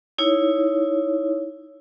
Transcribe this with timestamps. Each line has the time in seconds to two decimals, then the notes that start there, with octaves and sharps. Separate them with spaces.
0.18 D#4 E4 C#5